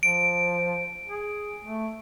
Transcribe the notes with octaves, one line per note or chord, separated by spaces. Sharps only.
F3 D7
G#4
A3